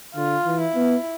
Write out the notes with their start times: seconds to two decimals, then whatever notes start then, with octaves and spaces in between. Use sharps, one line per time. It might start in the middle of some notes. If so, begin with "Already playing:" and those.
0.15 D3 F4
0.45 E3
0.61 E4
0.75 B3